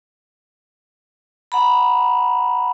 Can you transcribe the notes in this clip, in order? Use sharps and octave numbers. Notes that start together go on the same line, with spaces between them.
F#5 A#5 B5